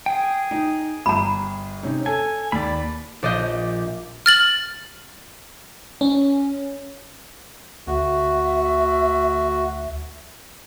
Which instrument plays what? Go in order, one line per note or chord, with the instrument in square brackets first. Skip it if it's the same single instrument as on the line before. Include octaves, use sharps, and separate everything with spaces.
[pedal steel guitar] G#4 G5
[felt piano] D#4
[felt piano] G1 [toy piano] A#5 B5
[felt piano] C3 C#4 D#4
[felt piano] A4 [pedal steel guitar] G#5
[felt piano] D#2 [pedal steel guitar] D5 B5
[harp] A#1 D5 D#5 G6
[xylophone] F6 A6 F#7
[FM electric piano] C#4
[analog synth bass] D2 [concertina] F#4 [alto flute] E5